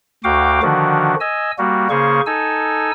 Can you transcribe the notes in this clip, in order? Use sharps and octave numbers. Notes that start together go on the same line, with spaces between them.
D2 F#4 F5 G5 D6
D3 D#3 F3 D4 F#4
D#5 G#5 E6
G3 A#3 F#4
C#3 A#3 G#4 C5 C#6
D#4 A4 G#5 E6